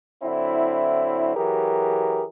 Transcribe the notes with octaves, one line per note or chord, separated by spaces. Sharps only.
D3 F#3 C4 E4
E3 F#3 G4 G#4 A#4